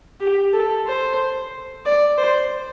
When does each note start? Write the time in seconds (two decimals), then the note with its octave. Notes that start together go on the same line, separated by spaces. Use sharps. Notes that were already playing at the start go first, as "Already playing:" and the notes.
0.21 G4
0.53 A4
0.87 C5
1.86 D5
2.18 C5